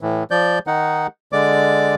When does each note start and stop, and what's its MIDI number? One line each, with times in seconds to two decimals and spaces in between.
0.01 0.24 45
0.01 0.24 52
0.31 0.59 53
0.31 0.59 74
0.31 0.59 91
0.67 1.07 51
0.67 1.07 63
0.67 1.07 78
1.33 1.95 50
1.33 1.95 56
1.33 1.95 74
1.33 1.95 86